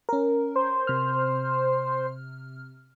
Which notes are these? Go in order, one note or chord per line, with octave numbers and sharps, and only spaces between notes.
C#4 A#4
C5
C3 F6